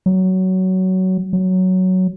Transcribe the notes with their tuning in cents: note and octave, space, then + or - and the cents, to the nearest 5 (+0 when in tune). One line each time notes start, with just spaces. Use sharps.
F#3 +15
F#3 +5